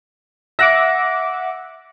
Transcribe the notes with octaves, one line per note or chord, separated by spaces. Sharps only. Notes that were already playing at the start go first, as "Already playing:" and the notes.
E5 F#5 D6 A#6